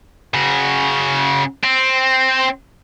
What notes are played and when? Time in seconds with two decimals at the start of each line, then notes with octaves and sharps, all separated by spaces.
0.34 C#3 F#4
1.64 C4